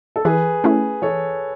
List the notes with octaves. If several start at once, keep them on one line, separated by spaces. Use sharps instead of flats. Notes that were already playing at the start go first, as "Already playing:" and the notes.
A4
E3 G#4 B4
A3 C#4 E4
E3 A4 C#5